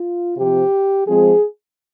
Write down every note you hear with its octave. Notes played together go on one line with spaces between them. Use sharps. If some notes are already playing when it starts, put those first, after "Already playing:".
Already playing: F4
C3 F3 C4 G4
F3 G#3 C4 G#4